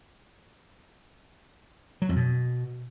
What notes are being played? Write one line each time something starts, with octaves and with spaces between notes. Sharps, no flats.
F#3
F2
B2